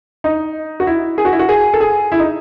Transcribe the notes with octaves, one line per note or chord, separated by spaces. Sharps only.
D#4
F#4
E4
G#4
F#4
E4
F#4
G#4
A4
G#4
E4
D#4